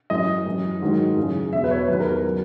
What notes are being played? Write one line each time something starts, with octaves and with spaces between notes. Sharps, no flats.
F#2 E3 D#5
F#2 E3
G#2 D#3 F#3
F#2 C#3 E3
E2 B2 F#3 E5
B4
C#5
E2 D#3 F#3 B4
A#4
A#4
C#3 F#3